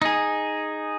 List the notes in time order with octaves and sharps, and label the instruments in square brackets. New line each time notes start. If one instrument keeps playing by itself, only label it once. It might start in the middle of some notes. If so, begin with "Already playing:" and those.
[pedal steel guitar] D#4 G#4